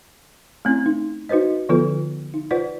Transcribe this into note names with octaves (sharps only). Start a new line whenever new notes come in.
A3 C4 C#4 E4
D#4
D#4 F#4 B4 C5 D#5
D3 F3 B3 F4 A4 B4
D#4
F4 B4 C5 D5 F#5